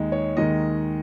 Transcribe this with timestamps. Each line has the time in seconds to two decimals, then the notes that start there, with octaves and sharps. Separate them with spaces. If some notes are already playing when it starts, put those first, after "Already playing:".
Already playing: D#2 D#3 G#3
0.12 C#5
0.37 D#2 D#3 G#3 D#5